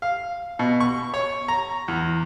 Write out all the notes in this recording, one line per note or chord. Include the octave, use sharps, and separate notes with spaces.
F5
B2
C#6
C#5
A#5
E2